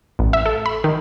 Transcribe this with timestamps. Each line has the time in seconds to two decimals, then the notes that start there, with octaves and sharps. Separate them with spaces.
0.19 A1
0.33 E5
0.46 A4
0.66 B5
0.84 D#3